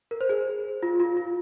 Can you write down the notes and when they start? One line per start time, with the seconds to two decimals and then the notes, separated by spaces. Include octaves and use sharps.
0.11 A#4
0.21 C5
0.29 G#4
0.83 F4
1.00 F4
1.17 F4